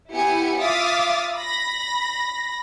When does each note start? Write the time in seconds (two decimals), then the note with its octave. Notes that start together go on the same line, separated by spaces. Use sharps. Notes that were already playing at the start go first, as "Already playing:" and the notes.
0.11 B3 E4 G4 G#5 C#7
0.60 F4 E5 F5 D6 D#6 A6
1.34 B5 A#6